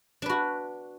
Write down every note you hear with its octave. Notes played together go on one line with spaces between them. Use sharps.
D4 F#4 B4